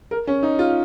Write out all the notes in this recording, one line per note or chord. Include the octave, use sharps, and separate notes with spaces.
A#4
C#4
D#4
F4